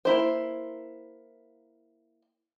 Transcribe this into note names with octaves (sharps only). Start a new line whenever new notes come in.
A#3 E4 C5